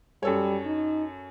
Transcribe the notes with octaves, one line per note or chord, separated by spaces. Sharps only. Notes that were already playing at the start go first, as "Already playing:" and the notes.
F#2 G3 A4 C#5
D#4